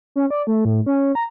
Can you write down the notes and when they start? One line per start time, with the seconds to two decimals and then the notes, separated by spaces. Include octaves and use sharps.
0.16 C#4
0.30 D5
0.47 A3
0.65 A2
0.86 C#4
1.15 A#5